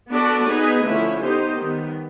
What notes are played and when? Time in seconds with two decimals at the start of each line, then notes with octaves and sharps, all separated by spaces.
0.11 B3 D4 F#4 A4 D5
0.48 B3 D#4 G#4 B4
0.84 D3 F3 A3 C#4 E4
1.21 B3 D#4 G4 C5
1.58 D#3 G3 B3